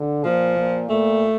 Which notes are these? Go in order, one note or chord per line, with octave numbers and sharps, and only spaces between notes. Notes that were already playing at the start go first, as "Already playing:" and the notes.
Already playing: D3
A#2 F3
A#2
A#2 A3